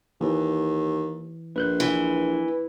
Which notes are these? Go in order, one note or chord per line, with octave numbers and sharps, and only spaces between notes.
D#2 E3
A#1 B4 F#6 G6
E3